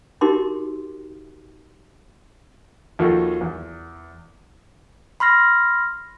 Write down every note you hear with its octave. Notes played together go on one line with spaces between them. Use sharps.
D#4 F#4 G4 A#4 C6 D6
D#2 F3 F4 F#4 A4
E2
B5 C6 F6 A#6